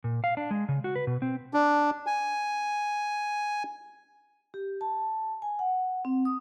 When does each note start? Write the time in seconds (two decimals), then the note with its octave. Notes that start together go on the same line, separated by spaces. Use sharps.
0.04 A#2
0.24 F5
0.37 D4
0.51 G#3
0.69 C#3
0.84 F#4
0.95 B4
1.07 B2
1.22 C4
1.54 D4
2.06 G#5
4.54 G4
4.81 A5
5.42 G#5
5.59 F#5
6.05 C4
6.25 D#6